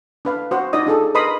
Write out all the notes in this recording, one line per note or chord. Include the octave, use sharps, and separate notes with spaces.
D4 B4 F5
F#4 C5
D#4 F4 D5 D#5 D#6
D4 G#4 A4
A#4 B4 D#5 B5 C6 D#6